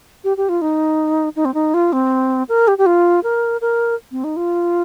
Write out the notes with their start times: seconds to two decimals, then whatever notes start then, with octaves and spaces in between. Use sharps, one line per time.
0.24 G4
0.37 G4
0.49 F4
0.61 D#4
1.36 D#4
1.45 C4
1.54 D#4
1.74 F4
1.93 C4
2.49 A#4
2.68 G4
2.78 G4
2.86 F4
3.23 A#4
3.61 A#4
4.12 C4
4.24 D#4
4.36 F4